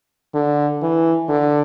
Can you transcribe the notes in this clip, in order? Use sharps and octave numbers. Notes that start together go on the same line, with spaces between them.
D3
E3
D3